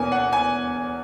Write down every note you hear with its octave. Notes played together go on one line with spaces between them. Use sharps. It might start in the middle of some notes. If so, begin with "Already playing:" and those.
Already playing: E2 B2 A#3 C#4 G#5
F#5
G#5